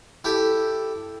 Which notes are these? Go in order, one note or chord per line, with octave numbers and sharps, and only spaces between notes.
E4 G4 A4